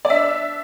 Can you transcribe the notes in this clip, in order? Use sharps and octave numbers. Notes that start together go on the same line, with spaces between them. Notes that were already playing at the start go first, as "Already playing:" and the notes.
D5
D4 E5